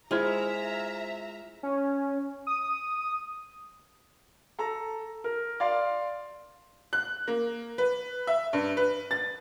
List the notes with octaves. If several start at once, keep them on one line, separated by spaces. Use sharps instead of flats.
G#3 E4 F4 C5 E5 A#5 F6 G#6
C#4
D#6
A4 A#5
A#4
D5 F5 C6
F#6
A#3
B4
E5
G2
B4
A6